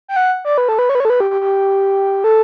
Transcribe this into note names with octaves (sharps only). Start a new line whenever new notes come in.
G5
F#5
D5
B4
A4
B4
C#5
B4
C#5
A4
B4
G4
G4
G4
A4